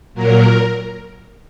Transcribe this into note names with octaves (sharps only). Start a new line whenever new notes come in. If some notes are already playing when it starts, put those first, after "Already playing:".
A#2 F#3 A#4